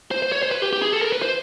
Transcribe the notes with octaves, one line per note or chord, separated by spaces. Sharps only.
C5
C5
C#5
C5
B4
G4
G4
G#4
A4
A#4
B4
C5